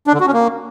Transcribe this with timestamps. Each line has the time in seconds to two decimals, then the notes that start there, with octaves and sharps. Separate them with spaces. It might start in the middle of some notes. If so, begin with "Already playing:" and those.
0.07 D4
0.14 D3
0.20 F#4
0.27 C#4
0.34 A#3